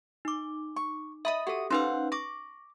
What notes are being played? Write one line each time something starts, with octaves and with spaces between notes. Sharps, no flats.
D#4 D6
C#6
D#5 E5 B5 D#6
F#4 G4 A4 D#6
C#4 D#4 B4 C5 F5 F#5
C#6 D6 A#6